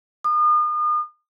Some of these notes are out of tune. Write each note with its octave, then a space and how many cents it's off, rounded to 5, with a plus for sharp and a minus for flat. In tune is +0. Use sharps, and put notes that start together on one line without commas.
D#6 -40